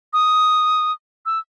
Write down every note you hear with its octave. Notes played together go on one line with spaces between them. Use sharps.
D#6
E6